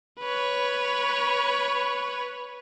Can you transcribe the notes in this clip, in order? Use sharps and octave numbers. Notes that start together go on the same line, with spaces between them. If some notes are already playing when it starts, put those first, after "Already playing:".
B4 C#5